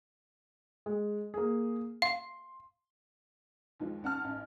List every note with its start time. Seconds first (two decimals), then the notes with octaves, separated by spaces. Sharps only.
0.86 G#3
1.34 A#3 G#4
2.02 F5 C6
3.80 D#2 F3 G#3
4.02 D#2 G#2 C#4 F#5 A5 F6
4.24 A1